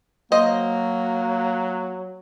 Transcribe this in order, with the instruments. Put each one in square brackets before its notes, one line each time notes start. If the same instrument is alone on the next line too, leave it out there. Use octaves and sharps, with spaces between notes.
[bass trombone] F#3 [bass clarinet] A#3 [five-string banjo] C5 D#5